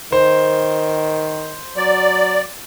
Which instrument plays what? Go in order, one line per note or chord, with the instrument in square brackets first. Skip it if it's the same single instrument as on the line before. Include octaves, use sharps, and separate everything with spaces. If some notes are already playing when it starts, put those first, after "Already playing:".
[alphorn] D#3 [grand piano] C5
[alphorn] F#3 [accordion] D5